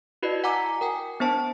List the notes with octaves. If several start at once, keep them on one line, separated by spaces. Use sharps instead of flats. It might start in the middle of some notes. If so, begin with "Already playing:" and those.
E4 F#4 B4 D5 D#5
F#5 G#5 A#5 D6 E6
A#4 G5 G#5
B3 D4 C5 A5